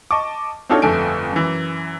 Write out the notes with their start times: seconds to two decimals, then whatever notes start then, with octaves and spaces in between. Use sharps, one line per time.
0.11 D#5 A5 C#6 D6
0.69 C4 D4 D#4 F4 A4 C#5
0.82 G1 F2 A3 A4 G#5 D7
1.33 F#2 E3